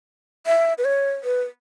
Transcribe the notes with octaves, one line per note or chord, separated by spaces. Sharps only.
E5
B4
C#5
B4